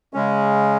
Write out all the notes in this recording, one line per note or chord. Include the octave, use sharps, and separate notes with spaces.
C#3 G#3 C#4